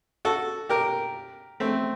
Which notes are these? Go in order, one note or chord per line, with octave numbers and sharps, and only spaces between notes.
F#4 A4
G4 A#4
A3 C4